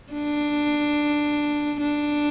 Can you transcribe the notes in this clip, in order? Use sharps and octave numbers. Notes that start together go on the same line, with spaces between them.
D4
D4